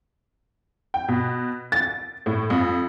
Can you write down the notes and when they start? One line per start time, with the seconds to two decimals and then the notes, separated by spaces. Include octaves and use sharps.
0.94 G5
1.08 B2
1.72 A6
2.26 A2
2.50 F2